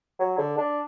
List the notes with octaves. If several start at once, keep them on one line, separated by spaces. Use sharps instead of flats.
F#3
D3
D4